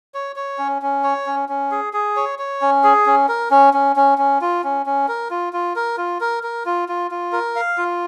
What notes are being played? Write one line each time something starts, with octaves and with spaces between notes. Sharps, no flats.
C#5
C#5
C#4
C#4
C#5
C#4
C#4
G#4
G#4
C#5
C#5
C#4
G#4
C#4
A#4
C#4
C#4
C#4
C#4
F4
C#4
C#4
A#4
F4
F4
A#4
F4
A#4
A#4
F4
F4
F4
A#4
F5
F4